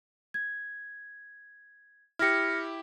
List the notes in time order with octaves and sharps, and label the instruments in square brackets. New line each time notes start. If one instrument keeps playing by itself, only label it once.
[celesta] G#6
[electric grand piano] E4 G4 [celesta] F6 A#6 C#7